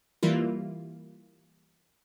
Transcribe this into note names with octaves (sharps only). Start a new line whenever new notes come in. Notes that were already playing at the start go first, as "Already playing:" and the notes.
E3 G3 A#3 E4 F4